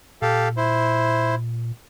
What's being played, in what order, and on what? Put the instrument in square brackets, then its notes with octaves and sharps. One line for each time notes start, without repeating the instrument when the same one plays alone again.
[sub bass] A#2 [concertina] G4 A4 F5
[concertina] E4 C5